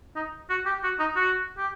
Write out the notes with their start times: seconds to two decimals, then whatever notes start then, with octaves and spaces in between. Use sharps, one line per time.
0.15 D#4
0.50 F#4
0.66 G4
0.84 F#4
0.99 D#4
1.16 F#4
1.58 G4